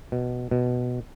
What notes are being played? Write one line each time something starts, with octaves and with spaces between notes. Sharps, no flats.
B2
B2